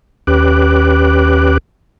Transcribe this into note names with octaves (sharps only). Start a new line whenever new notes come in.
D#2 C#4 G4 B4 D6 F#6